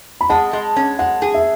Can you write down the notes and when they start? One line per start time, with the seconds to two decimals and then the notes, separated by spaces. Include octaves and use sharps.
0.21 B5
0.29 G#3 F#5 A5
0.53 G#3
0.76 C#4
0.99 G#3 F#5
1.22 G#4
1.34 E5